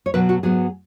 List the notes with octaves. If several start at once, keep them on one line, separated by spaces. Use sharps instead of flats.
C#5
B2 F#3 B3 B4
F#4
G#2 F#3 B3 G#4